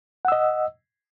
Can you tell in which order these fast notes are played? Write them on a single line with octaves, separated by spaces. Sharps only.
F#5 E6 D#5